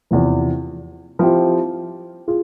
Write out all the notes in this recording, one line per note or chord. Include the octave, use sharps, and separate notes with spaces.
E2 C3 F3
F3 C4 E4 G4
F4 G#4